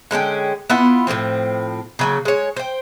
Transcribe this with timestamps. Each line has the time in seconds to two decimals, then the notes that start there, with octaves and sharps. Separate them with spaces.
0.11 D3 G#3 C#4 G5
0.70 B3 E4 F4 F#5
1.07 A2 D3 F3 C4
1.99 C#3 F#3 A#3
2.25 G#3 C#5
2.56 C5 G5